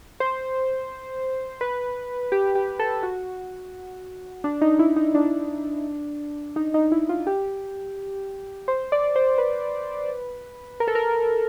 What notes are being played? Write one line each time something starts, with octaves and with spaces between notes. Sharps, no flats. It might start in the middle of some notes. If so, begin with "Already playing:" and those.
C5
B4
G4
G4
A4
F#4
D4
D#4
E4
D#4
D4
D#4
D#4
E4
F4
G4
C5
D5
C5
B4
A#4
A4
A#4